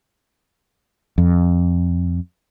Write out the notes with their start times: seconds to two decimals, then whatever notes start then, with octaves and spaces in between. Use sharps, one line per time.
1.18 F2